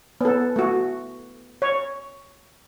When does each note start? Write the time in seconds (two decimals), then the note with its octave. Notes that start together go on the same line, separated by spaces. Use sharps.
0.21 B3 A4
0.56 A3 F#4
1.62 C#5